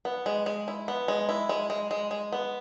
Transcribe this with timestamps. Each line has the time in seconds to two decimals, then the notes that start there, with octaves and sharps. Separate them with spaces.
0.05 B3
0.26 G#3
0.46 G#3
0.68 E4
0.88 B3
1.08 G#3
1.29 E4
1.49 G#3
1.70 G#3
1.91 G#3
2.11 G#3
2.33 B3